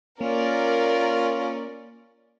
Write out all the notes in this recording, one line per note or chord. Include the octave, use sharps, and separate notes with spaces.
A#3 C#4 F4 A#4 D5